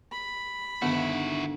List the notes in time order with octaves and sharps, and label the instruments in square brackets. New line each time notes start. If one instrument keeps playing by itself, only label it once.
[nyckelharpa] B5
[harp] D2 G2 D#3 [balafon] B3 [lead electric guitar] E4 F#4